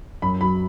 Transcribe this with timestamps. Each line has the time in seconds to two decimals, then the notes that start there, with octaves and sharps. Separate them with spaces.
0.22 F#2 B5
0.41 F#3 B5